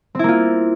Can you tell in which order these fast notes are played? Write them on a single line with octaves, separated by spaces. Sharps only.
C4 E4 A#3 F4